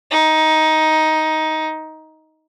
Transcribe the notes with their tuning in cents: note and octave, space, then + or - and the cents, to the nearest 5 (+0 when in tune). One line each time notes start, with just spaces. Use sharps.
D#4 +15